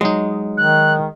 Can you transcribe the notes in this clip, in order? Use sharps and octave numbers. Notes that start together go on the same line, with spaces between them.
F#3 G#3 D#4
D#3 F#6